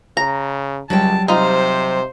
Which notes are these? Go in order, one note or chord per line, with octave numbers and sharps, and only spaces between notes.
C#3 A#5
C#2 F#3 G3 G5 A5
C3 D#4 F4 C5